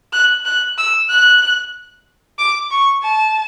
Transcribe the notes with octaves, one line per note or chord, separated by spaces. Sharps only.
F#6
F#6
E6
F#6
D6
C#6
A5